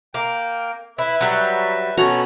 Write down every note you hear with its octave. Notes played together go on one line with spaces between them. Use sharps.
A#3 G5
E4 B4 E5
F#3 G3
B2 C#4 F#4 A4 C#5 A#5